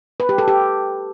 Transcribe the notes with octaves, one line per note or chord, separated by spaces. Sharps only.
B4
G4
A4
G4